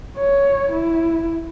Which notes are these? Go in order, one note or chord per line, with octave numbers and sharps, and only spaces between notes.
C#5
E4